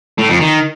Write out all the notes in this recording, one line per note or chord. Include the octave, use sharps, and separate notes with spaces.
A2
F2
D#3